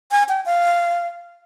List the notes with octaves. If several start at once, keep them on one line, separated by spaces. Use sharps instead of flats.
G#5
G5
F5